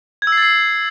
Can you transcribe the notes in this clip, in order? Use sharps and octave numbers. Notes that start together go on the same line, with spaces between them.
G#6
E6
C7
A6
C7